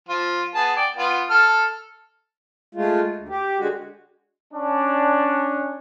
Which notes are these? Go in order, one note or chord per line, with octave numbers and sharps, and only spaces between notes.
F3 F4
B3 G#4 A5
D5 G5
B3 F4
A4 F6
G#3 A3 F4
D2
G4
D3 G#3 F#4
C#4 D4